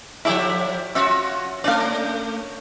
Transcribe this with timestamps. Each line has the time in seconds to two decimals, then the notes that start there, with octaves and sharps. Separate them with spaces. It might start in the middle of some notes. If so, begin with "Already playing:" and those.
0.25 F3 E4 G4 A4 D5 E5
0.95 C#4 F4 F#4 E5
1.64 A3 C#4 D4 D5 F5
1.80 A#3